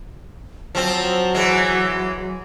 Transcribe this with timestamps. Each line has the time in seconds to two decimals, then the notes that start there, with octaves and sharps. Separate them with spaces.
0.75 F3 F#3 C4
1.34 E3 G#3